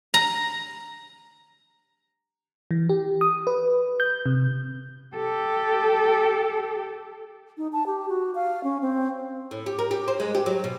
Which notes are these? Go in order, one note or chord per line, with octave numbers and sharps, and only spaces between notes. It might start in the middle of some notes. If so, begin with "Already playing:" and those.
A#5
E3
G4
D#6
B4
G6
C3
G4 A4
D#4
A5
G4
F#4
F5
C#4
C4
A2
G4
A#4
G4
C5
G#3
G4
F#3
B2